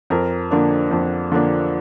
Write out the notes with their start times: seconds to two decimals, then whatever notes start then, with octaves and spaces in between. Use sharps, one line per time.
0.10 F2 A#4
0.51 D3 F3 A#3 D4
0.91 F2
1.31 D3 F3 A#3 D4